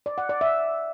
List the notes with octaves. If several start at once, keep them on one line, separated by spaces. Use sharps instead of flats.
D5
F#5
D5
E5